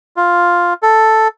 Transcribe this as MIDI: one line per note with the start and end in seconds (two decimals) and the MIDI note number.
0.17 0.73 65
0.82 1.28 69